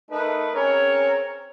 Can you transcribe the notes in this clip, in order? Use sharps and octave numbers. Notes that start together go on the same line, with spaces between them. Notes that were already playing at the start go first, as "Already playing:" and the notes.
A3 D#4 A#4 B4
C4 C#4 G#4 A#4 C#5